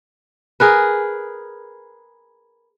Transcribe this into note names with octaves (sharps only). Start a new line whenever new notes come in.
G#4 A#4 B4